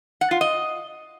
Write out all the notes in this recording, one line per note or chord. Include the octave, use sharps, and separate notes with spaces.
F#5
F4
D#5